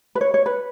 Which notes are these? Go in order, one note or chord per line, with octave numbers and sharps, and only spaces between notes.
B4
C#5
C#5
B4